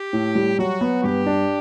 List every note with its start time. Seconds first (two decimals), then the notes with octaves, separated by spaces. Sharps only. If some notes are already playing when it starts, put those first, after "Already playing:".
Already playing: G4
0.13 A2
0.35 G3
0.59 F#3 F#4
0.81 B3
1.04 G2 G4
1.26 D4